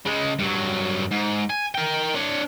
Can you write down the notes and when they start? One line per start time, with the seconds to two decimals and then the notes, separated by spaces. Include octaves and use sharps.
0.06 C#3 G#3
0.39 G2 F#3
1.11 G#2
1.50 G#5
1.74 A#4 G5
2.14 D4 C#5